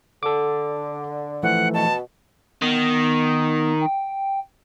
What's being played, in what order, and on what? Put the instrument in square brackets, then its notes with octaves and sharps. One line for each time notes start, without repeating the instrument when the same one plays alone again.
[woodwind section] D3 [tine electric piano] A4 D6
[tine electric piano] E3 F3 A3 [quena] F#5
[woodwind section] B2 [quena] A5
[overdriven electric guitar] D#3 [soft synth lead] B3
[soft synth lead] G5